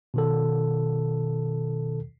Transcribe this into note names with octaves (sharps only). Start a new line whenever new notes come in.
B2 D#3 A4